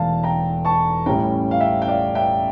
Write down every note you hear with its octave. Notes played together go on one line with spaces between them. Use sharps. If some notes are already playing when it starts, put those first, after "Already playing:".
Already playing: E1 E2 E3 A3 F5 A5
G5 A#5
A5 C#6
A1 A2 G3 C#4 G5 A#5
F5
E5 G5
G5
D5 F5
E5 G5